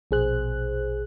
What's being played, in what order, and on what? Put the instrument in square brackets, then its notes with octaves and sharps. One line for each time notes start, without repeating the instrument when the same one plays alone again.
[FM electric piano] A#1 B2 G#4 C5 F#6